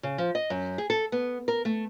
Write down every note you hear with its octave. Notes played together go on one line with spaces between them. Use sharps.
C#3
F3
D#5
F#2
G#4
A4
B3
A#4
A3